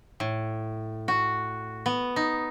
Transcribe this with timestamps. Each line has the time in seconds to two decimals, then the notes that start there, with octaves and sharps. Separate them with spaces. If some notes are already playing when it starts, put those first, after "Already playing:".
0.20 A2
1.08 F#4
1.86 B3
2.16 D#4